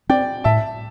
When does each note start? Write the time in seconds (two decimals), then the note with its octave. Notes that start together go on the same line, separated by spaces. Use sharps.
0.09 C4 D5 G5
0.44 A2 E5 A5